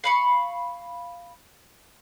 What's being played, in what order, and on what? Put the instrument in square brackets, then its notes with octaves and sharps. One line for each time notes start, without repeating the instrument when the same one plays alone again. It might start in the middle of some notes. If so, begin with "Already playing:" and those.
[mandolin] F5 B5 C#6